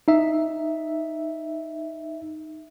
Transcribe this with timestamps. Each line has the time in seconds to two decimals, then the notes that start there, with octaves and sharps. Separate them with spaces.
0.08 D#4 E5